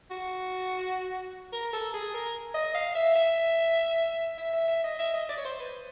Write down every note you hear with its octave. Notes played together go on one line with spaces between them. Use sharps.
F#4
A#4
A4
G#4
A#4
D#5
F5
E5
E5
E5
E5
E5
D#5
E5
D#5
D5
C#5
C5
B4